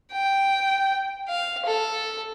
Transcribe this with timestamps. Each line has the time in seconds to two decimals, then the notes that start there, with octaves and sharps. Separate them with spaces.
0.12 G5
1.28 F5
1.65 A4